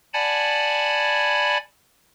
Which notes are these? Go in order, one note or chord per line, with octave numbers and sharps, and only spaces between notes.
D5 F#5 G#5 A5 B5 G#6